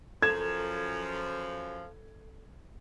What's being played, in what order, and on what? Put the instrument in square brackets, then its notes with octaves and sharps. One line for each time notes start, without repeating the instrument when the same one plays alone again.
[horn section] F#2 F3 [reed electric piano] A4 [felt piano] G#6 E7